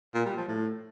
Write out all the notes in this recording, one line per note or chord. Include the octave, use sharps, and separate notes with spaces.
A#2
G3
F3
A2